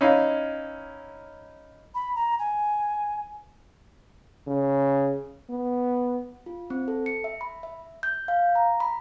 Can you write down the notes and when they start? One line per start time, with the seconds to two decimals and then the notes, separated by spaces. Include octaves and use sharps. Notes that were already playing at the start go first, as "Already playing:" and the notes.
0.01 C#4 D#4 E4 F5
1.95 B5
2.16 A#5
2.39 G#5
4.47 C#3
5.50 B3
6.46 F4
6.70 C4
6.88 A4
7.06 C#7
7.24 E5
7.41 B5
7.63 E5
8.03 G6
8.28 F5
8.55 A#5
8.80 B5